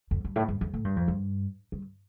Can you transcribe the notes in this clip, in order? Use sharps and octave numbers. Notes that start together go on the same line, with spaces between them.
F2
G2
A2
G2
F2
A2
G2
F2
G2
G2